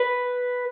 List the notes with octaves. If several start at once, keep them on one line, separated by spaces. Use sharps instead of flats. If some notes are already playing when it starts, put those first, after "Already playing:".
Already playing: B4